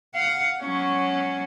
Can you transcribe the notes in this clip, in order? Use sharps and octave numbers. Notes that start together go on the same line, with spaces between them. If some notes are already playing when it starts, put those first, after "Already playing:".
F5 F#5
F#3 C#4